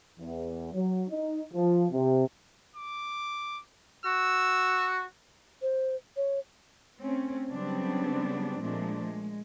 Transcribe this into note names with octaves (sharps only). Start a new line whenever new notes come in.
E2
F#3
D#4
F3
C3
D6
F#4 E6
C5
C#5
A3 C4 C#4
C#3 F#3 G3 B3 C4 D4
A#2 F3 G#3 A3 D4
G#3